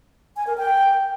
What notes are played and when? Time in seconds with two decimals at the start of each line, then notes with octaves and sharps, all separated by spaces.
0.37 G#5
0.47 A#4
0.58 G5